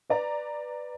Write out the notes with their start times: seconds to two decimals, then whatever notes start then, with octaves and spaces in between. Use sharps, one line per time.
0.10 B4 D5 A#5